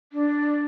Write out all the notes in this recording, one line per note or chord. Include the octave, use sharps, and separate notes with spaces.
D4